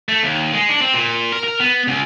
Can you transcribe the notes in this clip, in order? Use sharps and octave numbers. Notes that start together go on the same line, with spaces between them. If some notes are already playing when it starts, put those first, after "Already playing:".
A3
D#2
G#3
D4
C4
A#2
A#4
A#4
B3
C#2